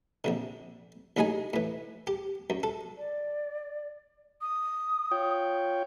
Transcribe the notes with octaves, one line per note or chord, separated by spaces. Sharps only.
A#1 F2 D3
D#2 A2 F#3 D#4 G#4 G#5
A2 E3
G4
F#2
A4
D5
D#6
F4 C#5 G5